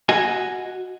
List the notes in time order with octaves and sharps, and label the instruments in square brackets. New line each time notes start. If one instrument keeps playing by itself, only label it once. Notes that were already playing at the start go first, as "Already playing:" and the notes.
[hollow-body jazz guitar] F#4 D#5 G#5